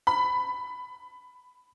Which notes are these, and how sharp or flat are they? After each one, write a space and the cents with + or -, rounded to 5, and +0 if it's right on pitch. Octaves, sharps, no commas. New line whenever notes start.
B5 +15